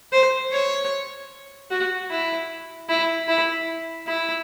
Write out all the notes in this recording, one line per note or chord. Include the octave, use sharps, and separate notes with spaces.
C5
C#5
F#4
E4
E4
E4
E4